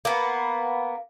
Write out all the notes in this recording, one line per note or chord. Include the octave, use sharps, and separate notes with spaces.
A#3 B3